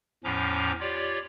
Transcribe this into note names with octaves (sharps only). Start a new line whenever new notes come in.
E2 A2 F3 C#4 A#5 D6
F4 G4 C#5 D5